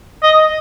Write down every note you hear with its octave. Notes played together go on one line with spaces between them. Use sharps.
D#5